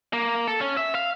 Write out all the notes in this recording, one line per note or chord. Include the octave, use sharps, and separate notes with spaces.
A#3
A4
C#4
E5
F5